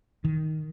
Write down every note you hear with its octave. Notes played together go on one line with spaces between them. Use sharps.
D#3